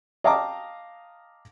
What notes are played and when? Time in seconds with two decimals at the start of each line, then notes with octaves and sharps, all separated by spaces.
0.24 D#5 F5 G5 A5 A#5 D6